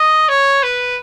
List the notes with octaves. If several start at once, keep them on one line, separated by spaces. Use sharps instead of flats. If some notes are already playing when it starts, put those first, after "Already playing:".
Already playing: D#5
C#5
B4